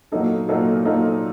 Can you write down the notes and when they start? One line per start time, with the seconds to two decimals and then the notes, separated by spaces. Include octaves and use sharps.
0.12 A#2 F#3 A#3 D#4 A4
0.48 A#2 F#3 A#3 D#4 A4
0.85 A#2 F#3 A#3 D#4 A4